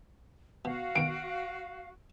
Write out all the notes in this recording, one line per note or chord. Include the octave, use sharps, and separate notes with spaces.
B2 F#4 F5
B2 D#3 D7